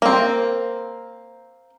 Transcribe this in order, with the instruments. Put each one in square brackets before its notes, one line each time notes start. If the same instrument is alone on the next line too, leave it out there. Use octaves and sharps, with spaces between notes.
[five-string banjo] A#3 C4